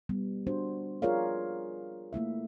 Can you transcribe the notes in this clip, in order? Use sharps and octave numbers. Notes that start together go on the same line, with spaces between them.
G3 B3
D4 F#4 C5
F4 G#4 A#4 C#5 D5 F5
A3 A#3 E4 E5